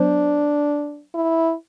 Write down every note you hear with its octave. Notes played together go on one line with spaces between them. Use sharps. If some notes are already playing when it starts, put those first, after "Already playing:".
Already playing: F#3 B3 D4 C5
E4